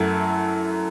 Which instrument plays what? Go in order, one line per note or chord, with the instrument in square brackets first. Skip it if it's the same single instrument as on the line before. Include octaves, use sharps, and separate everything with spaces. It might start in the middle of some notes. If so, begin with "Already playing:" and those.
Already playing: [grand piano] F#2 F#3 A3 E4